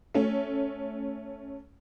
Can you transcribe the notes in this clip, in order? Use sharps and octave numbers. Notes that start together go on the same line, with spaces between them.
A3 C#4